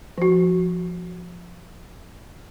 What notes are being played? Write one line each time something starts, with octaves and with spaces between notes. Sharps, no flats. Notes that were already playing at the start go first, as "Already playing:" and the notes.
F3 F#4